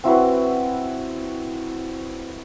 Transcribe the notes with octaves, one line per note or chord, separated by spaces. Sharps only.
C4 E4 F#4 B4